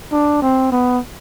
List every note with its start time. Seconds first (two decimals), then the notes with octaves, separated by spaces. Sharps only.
0.12 D4
0.42 C4
0.72 B3